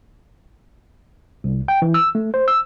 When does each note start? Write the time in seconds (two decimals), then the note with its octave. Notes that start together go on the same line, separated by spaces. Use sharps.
1.44 C2
1.68 G5
1.82 E3
1.94 E6
2.15 A3
2.34 C5
2.48 E6